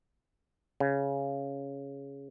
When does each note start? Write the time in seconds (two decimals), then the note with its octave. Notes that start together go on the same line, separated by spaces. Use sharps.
0.80 C#3